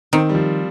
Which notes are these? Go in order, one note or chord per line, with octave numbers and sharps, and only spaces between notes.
D#3 C4
G3
F3